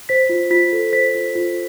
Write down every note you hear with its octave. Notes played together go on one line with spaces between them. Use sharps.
C5 B6
F4
F4 B6
A4
C5 B6
F4
F4